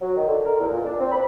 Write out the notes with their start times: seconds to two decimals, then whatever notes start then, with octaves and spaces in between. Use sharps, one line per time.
0.01 F#3
0.16 D#3
0.27 D3
0.44 A#4
0.60 E2
0.71 A#2
0.84 D4
0.99 C4
1.11 B5